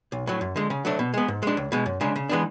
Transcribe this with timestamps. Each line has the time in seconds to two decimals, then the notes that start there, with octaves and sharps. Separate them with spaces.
0.12 B1
0.27 A2 F#3
0.41 F#2
0.56 D3 G#3
0.70 C#3
0.85 F#3 A3 D4
0.99 B2
1.14 G#3 B3
1.28 G#2
1.43 G#3 D4
1.57 C#2
1.72 B2 G#3
1.86 F#2
2.01 C#3 G#3 D4
2.16 C#3
2.29 E3 G#3 B3 D4